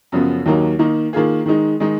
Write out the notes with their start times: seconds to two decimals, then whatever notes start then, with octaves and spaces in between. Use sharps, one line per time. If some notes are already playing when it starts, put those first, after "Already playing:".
0.12 F#2 C#3 F3 B3
0.46 D#2 D#3 F#3 A#3 D#4
0.79 D#3 A#3 D#4
1.13 D#3 A#3 F4 G#4
1.46 D#3 G#3 D#4
1.80 D#3 G#3 D#4